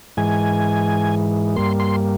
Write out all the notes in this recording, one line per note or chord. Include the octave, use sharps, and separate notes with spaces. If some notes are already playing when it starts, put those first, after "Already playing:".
G#2 E3 G#3 G#5
G2 G3 A#3 C6
C6